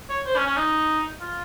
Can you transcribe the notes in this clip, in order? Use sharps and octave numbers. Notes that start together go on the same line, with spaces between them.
C#5
C5
C#4
C#4
D#4
F4